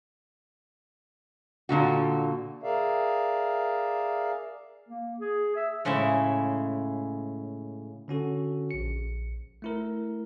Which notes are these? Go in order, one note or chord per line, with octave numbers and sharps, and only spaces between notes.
A#2 D3 F#4
G#4 A#4 D5 E5 F5
A#3
G#4
E5
A2 C#3 G#3 E4 E5
D3 C#4 F#4 A4
A#1 C#7
A3 E4 A#4